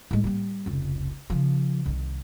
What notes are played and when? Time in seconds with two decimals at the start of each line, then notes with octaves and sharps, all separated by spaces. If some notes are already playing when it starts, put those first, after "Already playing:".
0.11 A2 G#3
0.24 G3 A#3
0.66 F1 C#2
1.30 C#3 F3
1.86 C2 D#3